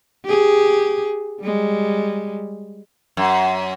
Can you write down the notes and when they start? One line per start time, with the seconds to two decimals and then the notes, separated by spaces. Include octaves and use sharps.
0.25 G4 G#4
1.40 G3 G#3
3.17 F#2